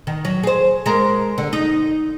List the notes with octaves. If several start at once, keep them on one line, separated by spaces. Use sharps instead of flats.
D#3
F#3
G#4 C5
G#3 A#4
D3
D#4